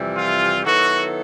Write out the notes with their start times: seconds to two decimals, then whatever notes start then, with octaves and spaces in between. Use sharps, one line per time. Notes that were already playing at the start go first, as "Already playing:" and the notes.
Already playing: F2 C3 E3 G3
0.17 F4
0.65 D#3 F#3 B3 E4 F#4 A4